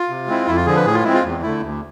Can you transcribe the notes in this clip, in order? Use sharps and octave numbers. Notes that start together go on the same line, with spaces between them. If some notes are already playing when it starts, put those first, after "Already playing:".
Already playing: F4
C3
G#3 C4 E4
F2 E4
F4
D3 F3 G#4
B4
A2 G#4
F4
G#3 C4 E4
F4
E2
D3 A3 E4
D2